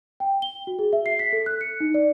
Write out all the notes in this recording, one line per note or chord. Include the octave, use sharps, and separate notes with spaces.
G5
G7
F#4
G#4
E5
C7
B6
A4
F#6
C#7
D#4
D5